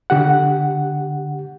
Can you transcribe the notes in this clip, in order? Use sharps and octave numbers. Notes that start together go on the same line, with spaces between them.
D3 G4 F#5